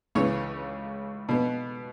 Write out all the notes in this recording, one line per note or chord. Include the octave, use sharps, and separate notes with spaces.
C#2 C#3 E3 C#4 C#5
B2 B3